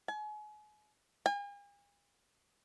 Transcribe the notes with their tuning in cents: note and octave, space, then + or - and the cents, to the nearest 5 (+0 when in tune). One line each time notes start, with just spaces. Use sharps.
G#5 +35
G#5 -45